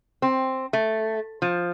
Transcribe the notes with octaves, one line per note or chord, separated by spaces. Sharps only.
C4
A3
F3